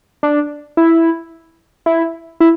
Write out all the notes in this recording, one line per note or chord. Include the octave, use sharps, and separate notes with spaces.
D4
E4
E4
E4